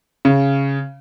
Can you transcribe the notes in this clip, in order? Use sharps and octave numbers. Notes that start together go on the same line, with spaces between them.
C#3